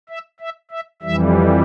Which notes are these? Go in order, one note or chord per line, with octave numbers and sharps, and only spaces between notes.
E5
E5
E5
F2 E3 G3 E5